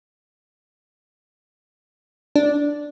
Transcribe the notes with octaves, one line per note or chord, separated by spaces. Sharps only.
D4